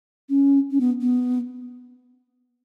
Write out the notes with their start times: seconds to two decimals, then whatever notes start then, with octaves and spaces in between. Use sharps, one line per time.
0.29 C#4
0.70 C#4
0.80 B3
1.01 B3